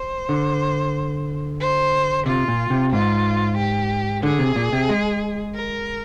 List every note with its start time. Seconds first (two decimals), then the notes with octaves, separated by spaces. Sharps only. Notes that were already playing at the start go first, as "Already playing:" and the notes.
Already playing: C5
0.29 D3
1.60 C5
2.26 C3 F4
2.48 A#2
2.70 C3
2.92 G#2 F4
3.58 G4
4.23 D3 G#4
4.39 C3
4.56 A#2
4.73 C3
4.89 G#3
5.55 A#4